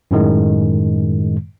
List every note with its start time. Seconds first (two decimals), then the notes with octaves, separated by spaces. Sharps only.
0.11 F#2 A2 D#3 G#3